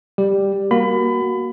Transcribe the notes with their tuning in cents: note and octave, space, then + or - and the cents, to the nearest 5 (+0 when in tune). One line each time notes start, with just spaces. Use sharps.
G3 +5 G4 +0
A#3 +15 F#4 +5 B5 +25